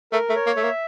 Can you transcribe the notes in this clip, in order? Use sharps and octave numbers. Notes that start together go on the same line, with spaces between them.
A3 A#4
A3
C#5
A#3
A3 E5
A#3